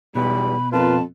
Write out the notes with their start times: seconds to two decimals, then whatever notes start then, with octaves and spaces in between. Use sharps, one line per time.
0.15 B1 E2 B2 G3 B5
0.73 F2 F4 A#4 B4 A5